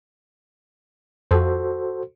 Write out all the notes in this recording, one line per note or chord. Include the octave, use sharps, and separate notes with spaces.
F2 F#4 A4 C5